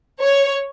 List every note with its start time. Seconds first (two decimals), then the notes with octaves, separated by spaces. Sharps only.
0.21 C#5